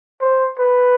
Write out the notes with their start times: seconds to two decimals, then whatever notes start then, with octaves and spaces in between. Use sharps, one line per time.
0.21 C5
0.58 B4